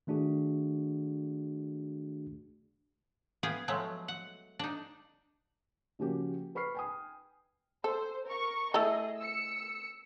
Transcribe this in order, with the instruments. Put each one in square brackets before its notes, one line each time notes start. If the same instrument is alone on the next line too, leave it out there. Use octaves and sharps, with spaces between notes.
[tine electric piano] D#3 A3 D4 F#4 G#4
[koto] B3 G#4 F5 G5
F3 F#3 G#3 A3
F#5
D4 D#4
[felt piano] C#3 F3 A#3 C#4 F#4 G4
B4 B5 C#6 F6 C7
G5 G#5 D#6
[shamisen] A4 [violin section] C5
[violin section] A#4 C#6
[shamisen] A3 E4 A4 [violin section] G#4 D#5
[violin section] E6 C#7